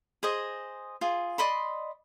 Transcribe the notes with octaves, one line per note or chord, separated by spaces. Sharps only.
G#4 C5 D#5
F4 G#4
D5 D#5 B5 C6